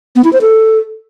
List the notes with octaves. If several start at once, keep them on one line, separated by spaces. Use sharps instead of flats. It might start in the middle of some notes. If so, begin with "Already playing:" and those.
B3
E4
C5
A4